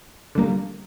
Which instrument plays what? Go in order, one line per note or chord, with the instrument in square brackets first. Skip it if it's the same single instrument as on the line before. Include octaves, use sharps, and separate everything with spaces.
[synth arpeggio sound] D3 G3 A#3